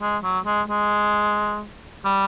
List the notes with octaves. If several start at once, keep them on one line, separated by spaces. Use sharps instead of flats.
G#3
F#3
G#3
G#3
G3